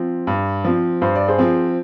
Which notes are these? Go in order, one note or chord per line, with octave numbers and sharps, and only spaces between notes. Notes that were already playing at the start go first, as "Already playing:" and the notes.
Already playing: F3 C4
G2
F3 C4
G2 C5
D5
G#4 C5
F3 C4